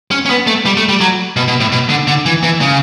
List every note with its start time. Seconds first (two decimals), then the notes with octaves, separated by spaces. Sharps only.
0.11 C#4
0.26 C#4
0.30 B3
0.47 A3
0.66 G3
0.77 A3
0.89 G3
1.01 F#3
1.36 B2
1.48 B2
1.60 A2
1.72 B2
1.90 D3
2.07 D3
2.26 E3
2.43 E3
2.61 C#3